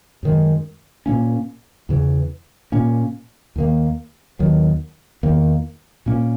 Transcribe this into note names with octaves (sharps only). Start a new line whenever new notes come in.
F#2 D#3 G#3
A#2 A#3 C#4
E2 C#3 E3
A#2 A#3 C#4
D#2 D#3 A#3
D#2 D#3 F#3
E2 D#3 A#3
A#2 A#3 C#4